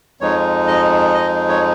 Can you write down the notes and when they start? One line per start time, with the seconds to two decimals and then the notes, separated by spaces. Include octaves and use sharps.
0.21 F2 F3 G#3 D#4 C#5
0.68 D#5
1.14 D#5
1.49 C#5